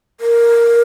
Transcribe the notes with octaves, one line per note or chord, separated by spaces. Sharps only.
A#4